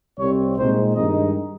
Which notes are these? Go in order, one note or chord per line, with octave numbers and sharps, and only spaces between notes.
C2 C3 G3 C4 C#5
A#2 G#3 C4 D#4 C5
G2 D#3 G#3 D#4 D#5